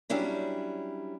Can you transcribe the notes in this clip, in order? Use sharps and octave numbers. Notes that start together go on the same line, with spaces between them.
F#3 G3 C#4 D4 E4